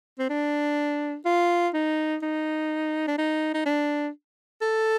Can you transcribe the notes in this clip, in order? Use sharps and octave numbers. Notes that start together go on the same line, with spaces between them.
C4
D4
F4
D#4
D#4
D4
D#4
D#4
D4
A4